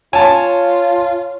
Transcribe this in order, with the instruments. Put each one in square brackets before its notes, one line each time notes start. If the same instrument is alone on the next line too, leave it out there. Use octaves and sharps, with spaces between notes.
[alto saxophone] F4 [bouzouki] C#5 [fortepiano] G#5 A5